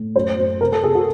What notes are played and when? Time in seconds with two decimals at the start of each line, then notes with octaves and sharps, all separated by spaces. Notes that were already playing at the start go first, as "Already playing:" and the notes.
Already playing: A2
0.16 F#2 C5
0.37 F#2
0.61 C3 A#4
0.72 A4
0.83 C3 G#4
0.95 F#4